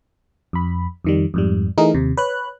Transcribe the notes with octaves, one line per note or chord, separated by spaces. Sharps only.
F2 B5
F2 D#3 G3
F2 G#2 G3
E3 A3 D#4 G#4 A#4
D#2 C3
B4 C#5 F#6